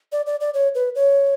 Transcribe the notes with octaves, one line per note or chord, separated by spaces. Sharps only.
D5
D5
D5
C#5
B4
C#5